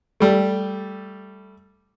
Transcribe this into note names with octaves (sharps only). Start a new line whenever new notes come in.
G3 A3